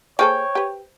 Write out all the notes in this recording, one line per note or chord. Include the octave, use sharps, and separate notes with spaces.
A#3 G#4 A4 C5 C#5 G5 C#6
G4 B4